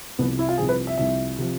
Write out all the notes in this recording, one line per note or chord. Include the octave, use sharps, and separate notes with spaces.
C2 C3 F3 B3
E4
F4
C2 C3 F3 G#4
B4
E5
C2 C3 F3 E5
C3 F3